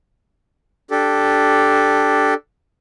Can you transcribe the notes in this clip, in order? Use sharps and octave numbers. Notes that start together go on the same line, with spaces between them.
D4 G4 A4